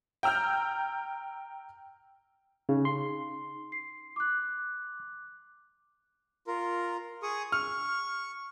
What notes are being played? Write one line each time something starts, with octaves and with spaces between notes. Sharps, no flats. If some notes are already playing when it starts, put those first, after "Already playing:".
G5 A#5 E6 F6 G6
C#3 D#4
C6
C7
D6 F#6
F4 A#4
G#4 C#6 D#6
C#6 F6